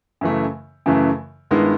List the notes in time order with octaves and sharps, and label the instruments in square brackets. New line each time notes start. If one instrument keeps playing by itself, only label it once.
[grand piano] F#2 C#3 E3 A3
F#2 C#3 E3 A3
G2 D#3 G#3 B3 E4